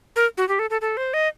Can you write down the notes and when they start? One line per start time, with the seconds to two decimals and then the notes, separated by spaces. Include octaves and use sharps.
0.16 A#4
0.37 F#4
0.49 G4
0.59 A4
0.70 A4
0.81 A4
0.97 C5
1.14 D#5